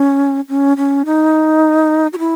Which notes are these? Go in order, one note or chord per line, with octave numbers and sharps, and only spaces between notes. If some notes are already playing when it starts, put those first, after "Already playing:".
Already playing: C#4
C#4
C#4
D#4
F#4
E4